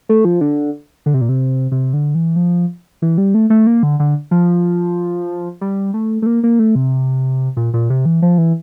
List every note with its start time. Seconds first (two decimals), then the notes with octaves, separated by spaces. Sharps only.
0.09 A3
0.25 F3
0.41 D3
1.06 D3
1.14 C3
1.21 A#2
1.29 C3
1.72 C3
1.93 D3
2.15 E3
2.36 F3
3.02 E3
3.18 G3
3.34 A3
3.50 A3
3.67 A#3
3.83 D3
4.00 D3
4.31 F3
5.61 G3
5.94 A3
6.22 A3
6.26 A#3
6.43 A#3
6.59 A3
6.75 C3
7.57 A#2
7.74 A#2
7.90 C3
8.05 E3
8.22 F3
8.38 E3